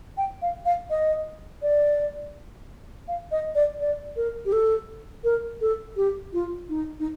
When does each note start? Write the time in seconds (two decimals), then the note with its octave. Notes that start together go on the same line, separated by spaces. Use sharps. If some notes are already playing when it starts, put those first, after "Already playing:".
0.18 G5
0.42 F5
0.65 F5
0.90 D#5
1.62 D5
3.08 F5
3.31 D#5
3.55 D5
3.80 D5
4.16 A#4
4.45 G4
4.52 A4
5.24 A#4
5.61 A4
5.96 G4
6.33 F4
6.69 D#4
7.00 D#4